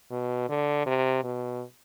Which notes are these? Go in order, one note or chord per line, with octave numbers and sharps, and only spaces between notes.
B2
D3
C3
B2